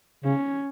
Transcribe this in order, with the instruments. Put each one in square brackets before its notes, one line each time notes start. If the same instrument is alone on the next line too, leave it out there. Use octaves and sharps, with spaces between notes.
[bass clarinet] C#3 [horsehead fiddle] C#4